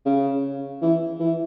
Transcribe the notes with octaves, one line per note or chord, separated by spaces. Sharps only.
C#3
E3
E3